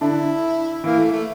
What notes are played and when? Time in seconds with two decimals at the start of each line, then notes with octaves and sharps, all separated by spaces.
0.01 D3 D4 E4
0.84 E3 A#3 E4
0.99 A3
1.11 A3